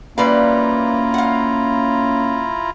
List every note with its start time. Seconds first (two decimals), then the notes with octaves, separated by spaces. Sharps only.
0.18 G3 A#3 C#4 E4 F4 B4 F5 A#5
1.14 F5 F#5